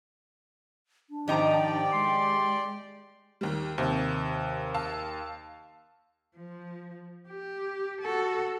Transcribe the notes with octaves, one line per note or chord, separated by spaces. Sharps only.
D4
G#2 D#3 F3 D#4 G4 D5 G5 A#5
G#3 C6
D#2 G3
D#2 C3
F5 A5 E6
F3
G4
F#4 A4